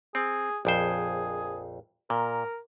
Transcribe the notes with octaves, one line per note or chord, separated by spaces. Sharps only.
C4 G#4
A#1 F2 G#4 C5
A#2 A#4